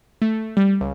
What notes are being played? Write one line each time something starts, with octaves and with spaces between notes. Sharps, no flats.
A3
G3
C#2